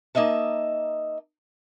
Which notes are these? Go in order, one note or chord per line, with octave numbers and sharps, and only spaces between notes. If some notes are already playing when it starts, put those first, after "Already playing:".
A#3 D#4 D#5 E5 A5